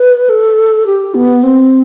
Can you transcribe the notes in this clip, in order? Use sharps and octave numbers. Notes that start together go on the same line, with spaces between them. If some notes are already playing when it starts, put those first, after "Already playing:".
Already playing: B4
A4
G4
B3
C4